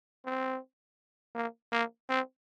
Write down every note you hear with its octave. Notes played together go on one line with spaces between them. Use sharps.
C4
A#3
A#3
C4